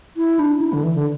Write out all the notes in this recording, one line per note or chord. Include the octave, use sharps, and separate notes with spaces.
E4
D4
D4
E4
D3
E3
D3